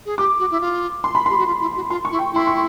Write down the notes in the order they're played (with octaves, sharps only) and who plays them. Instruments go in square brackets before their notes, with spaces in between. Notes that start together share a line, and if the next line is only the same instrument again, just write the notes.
[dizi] G#4
[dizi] G4 [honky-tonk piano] D6
[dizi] F#4
E4
F4
[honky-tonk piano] C6
B5
[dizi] G4 [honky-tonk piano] C6
[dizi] F#4
F4
E4
F#4
[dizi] F4 [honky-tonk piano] C6
[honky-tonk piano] C#6
[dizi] E4
[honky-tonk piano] G5
[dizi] E4 [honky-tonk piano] C6
[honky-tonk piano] C#6